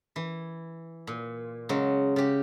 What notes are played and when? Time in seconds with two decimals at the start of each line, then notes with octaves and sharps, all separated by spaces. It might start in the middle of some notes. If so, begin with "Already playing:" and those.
0.16 E3
1.07 A#2
1.69 C#3 F#3 G#3
2.16 C#3 G4